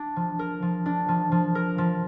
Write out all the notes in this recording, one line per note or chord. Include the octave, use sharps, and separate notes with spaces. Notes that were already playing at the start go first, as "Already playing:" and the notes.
Already playing: D4
F3
A#4
F3
D4
F3
F3
A#4
F3